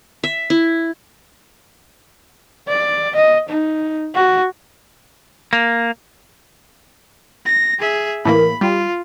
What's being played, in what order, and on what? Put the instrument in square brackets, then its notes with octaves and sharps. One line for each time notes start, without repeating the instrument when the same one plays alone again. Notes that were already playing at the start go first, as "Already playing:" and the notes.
[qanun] E5
E4
[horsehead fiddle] D5
D#5
D#4
F#4
[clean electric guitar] A#3
[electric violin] A#6
G#4 E5
[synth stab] A2 E3 A#3 [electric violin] B5
[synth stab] G3 [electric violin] F4